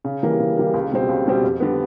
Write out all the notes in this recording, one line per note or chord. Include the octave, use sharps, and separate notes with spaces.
C#3
E3 G3 A#3
C#3
E3 G3 A#3
C#2
B2 G3 C4
C#2
B2 G3 C4
F2
D3 G3 B3